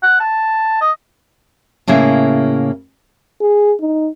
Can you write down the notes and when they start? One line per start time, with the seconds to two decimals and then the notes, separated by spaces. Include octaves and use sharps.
0.03 F#5
0.20 A5
0.81 D#5
1.87 A2 C#3 A#3 E4 G#4
3.41 G#4
3.81 D#4